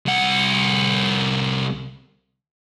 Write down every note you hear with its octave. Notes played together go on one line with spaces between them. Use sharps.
C2 F#5